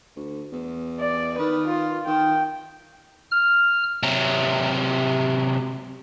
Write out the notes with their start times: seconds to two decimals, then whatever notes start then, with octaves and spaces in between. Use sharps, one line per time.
0.16 D2
0.52 E2
1.01 D5
1.39 D#3 B4
1.68 F4
2.07 D#3 G5
3.31 F6
4.03 C3 F#3